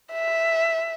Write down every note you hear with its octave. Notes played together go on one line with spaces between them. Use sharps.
E5